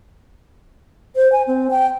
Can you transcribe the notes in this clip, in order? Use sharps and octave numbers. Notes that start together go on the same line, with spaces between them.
C5
G#5
C4
G5